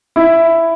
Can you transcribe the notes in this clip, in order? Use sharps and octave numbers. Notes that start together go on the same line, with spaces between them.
E4